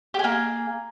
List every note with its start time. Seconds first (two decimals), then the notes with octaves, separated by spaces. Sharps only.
0.14 G4
0.19 G#4
0.24 A#3